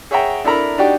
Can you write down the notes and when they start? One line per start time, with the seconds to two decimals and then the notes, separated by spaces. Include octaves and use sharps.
0.11 G#4 C#5 E5 F#5 G5 A#5
0.44 D4 E4 A4 A#4 A#5 B5
0.78 D4 D#4 F#4 G4 D5 G5